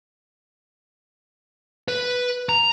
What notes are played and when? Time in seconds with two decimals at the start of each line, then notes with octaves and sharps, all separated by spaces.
1.88 B4
2.49 A#5